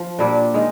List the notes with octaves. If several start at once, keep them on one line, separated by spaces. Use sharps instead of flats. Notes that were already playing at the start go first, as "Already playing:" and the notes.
Already playing: F3
A#2 G3 A#3 D4
D#3 G#3